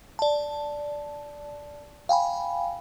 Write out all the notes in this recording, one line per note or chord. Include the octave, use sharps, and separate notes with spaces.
D5 A5
F5 G5 G#5 B5